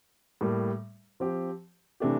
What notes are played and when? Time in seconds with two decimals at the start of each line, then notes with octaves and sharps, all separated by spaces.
0.41 A2 G3 A#3
1.20 F3 C4 G4
2.00 C3 E3 A3 D4 G4